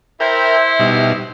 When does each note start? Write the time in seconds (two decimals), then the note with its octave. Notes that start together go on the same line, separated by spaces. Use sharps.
0.20 E4 A#4 C5 E5 G5
0.80 B2 G3 D#4